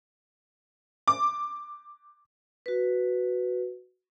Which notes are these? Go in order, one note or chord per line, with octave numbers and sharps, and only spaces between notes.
D6
F#4 B4